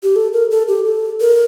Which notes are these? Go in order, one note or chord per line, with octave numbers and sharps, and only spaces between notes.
G4
A4
A#4
A4
G4
A4
A#4